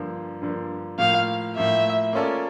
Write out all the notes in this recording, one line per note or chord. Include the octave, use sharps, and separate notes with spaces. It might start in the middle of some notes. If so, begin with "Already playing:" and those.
Already playing: G2 D3 F3 A#3
G2 D3 F3 A#3
A2 F3 A#3 F5
A2 F3 A#3 E5
A#3 C#4 F4 A4 D5